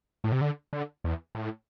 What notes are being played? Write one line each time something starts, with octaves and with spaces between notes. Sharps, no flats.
A2
C3
D3
D3
E2
A2